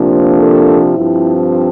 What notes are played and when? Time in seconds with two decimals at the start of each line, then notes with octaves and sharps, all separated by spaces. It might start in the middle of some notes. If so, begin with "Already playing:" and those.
Already playing: C3 F3 A#3 D4
0.40 A4
0.95 G2 F3 C4 E4